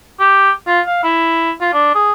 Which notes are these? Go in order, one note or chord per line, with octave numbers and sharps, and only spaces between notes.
G4
F4
F5
E4
F4
D4
G#4